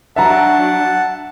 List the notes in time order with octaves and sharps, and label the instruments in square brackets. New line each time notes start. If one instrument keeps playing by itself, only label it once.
[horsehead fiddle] F#3 D4 [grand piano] E5 A#5 [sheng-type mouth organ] F#5 A5